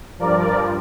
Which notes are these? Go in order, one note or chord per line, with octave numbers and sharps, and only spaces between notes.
G2 F3 A#4 D5